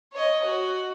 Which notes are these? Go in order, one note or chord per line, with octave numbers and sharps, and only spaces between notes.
C#5 D#5
F#4